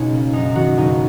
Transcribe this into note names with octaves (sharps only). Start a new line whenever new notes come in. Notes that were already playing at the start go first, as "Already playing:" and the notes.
Already playing: C#2 B2 C#4 D#4
A#3
F#2 D#4
D#3 F#4
F#1 D#4